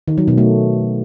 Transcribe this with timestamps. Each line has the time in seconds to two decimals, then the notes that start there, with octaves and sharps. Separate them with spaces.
0.08 D#3
0.18 F#3
0.28 B2
0.38 A3